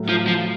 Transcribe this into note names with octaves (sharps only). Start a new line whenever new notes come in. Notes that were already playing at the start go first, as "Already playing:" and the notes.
Already playing: A2 F#3 A3
F3
F3